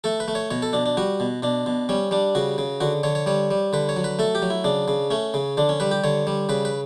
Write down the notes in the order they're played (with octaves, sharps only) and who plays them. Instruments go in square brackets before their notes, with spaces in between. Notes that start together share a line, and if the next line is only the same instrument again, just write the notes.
[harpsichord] A3 A4
B4
A3
C#5
B2 C#5
A4
B2 D4
D4
G3 F#4
B2
B2 D4
B2
G3 C#4
G3 D4
C#3 F#4
C#3
D3 F#4
D3 C#5
C#5
G3 C#5
G3
D3 B4
C#5
F#3
B4
A3 A4
G4
F#3
E4
C#3 D4
C#3
A3 C#4
C#3
D3 D4
C#4
G3 B4
G4
D3 C#5
G3
C#3 B4
B4